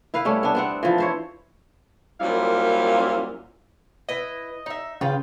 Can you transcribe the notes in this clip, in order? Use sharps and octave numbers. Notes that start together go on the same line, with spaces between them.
E4 B4 F5
G3 A3 C#4
B3 D4
B3 C4 F#5
E3 F3
E4 C5 C#5
F#2 A#2 G3 C4 E4 F5
E4 B4 D#5
D#4 E5
C#3 F4 G4 B4